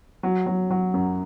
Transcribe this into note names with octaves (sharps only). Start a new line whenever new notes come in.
F#3
F#3
F#3
F#2